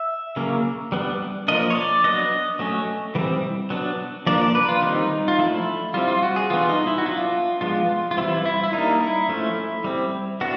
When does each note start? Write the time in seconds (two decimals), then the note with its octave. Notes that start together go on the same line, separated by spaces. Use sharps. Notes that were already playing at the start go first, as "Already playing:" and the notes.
Already playing: E5
0.36 C#3 F#3 A#3 C#4
0.92 G3 B3 D4
1.48 F3 A#3 D4 D#5
1.70 C#5
1.75 D5
2.04 F#3 B3 D4 D#5
2.59 F#3 A3 C#4
3.15 E3 G3 C4
3.70 F#3 B3 D4
4.27 F3 A#3 D4 D5
4.41 D5
4.55 B4
4.69 F4
4.82 D#3 G3 C4 D#4
5.28 F4
5.39 F3 A3 D4 E4
5.94 G3 C4 F4
6.08 F4
6.23 F#4
6.36 G#4
6.50 E3 G3 B3 D4 F4
6.69 D#4
6.87 E4
6.98 F#4
7.06 F#3 B3 D4 F4
7.61 F3 G#3 B3 D4 F4
8.11 F4
8.17 E3 G3 C4 E4
8.46 E4
8.64 E4
8.73 G3 A#3 D4 D#4
9.01 E4
9.29 F3 A3 C#4
9.84 G3 C4
10.41 B3 D4 F#4